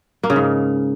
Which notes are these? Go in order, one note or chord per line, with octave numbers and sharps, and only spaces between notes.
A#3
C#3
G#2